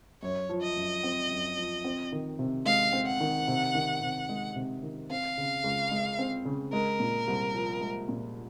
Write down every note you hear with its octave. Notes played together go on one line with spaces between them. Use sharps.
F#2 C#5
F3
D#5
F#2
C4
F#2
F3
C4
D#3
C3
G#3 F5
C4
F#5
D#3
C3
D#3
C3
G#3
C3
D#3
C4 F5
C#3
C#2
G#3
C4
C#3
G#3 A#4
A#2
C2
F3
G#3
A#2